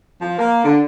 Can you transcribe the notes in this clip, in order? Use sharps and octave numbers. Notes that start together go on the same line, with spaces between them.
F3
A#3
D3